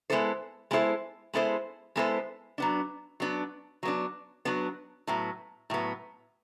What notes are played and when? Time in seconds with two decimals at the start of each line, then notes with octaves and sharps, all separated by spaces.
0.10 G#3 B3 E4 A4 C5
0.71 G#3 B3 E4 A4 C5
1.34 G#3 B3 E4 A4 C5
1.96 G#3 B3 E4 A4 C5
2.58 F#3 B3 D4
3.20 F#3 B3 D4
3.83 F#3 B3 D4
4.45 F#3 B3 D4
5.07 A2 F#3 B3
5.70 A2 F#3 B3